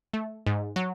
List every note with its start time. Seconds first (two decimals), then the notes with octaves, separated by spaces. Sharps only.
0.14 A3
0.46 G#2
0.76 F#3